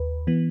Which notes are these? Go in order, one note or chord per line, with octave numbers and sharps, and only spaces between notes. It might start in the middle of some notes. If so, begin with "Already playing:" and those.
Already playing: D#2 B4
E3 B3